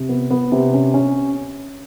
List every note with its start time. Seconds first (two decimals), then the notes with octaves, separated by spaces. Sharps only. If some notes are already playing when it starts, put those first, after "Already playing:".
Already playing: C3
0.09 B3
0.30 B3
0.52 C3
0.74 C#4
0.94 C#4